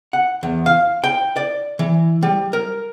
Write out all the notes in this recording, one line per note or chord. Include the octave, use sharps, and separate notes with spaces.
F#5
E2
F5
G5
D5
E3
G3
A#4